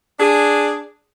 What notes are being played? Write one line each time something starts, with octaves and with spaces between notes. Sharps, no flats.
D4 G#4